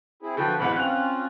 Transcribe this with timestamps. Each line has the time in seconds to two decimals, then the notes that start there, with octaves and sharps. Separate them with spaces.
0.22 C4 E4 G#4
0.37 D3 F3 F#4 B4 G5
0.59 D1 E2 G#3 F#5 B5
0.76 C4 C#4 F4 F#6 F7